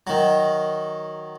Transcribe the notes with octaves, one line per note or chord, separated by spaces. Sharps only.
D#3 F#3